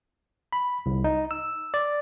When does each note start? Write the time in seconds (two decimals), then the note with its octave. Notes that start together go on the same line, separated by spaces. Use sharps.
0.53 B5
0.86 C2
1.04 D#4
1.31 E6
1.74 D5